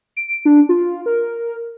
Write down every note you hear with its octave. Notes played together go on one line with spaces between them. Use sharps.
D7
D4
F4
A#4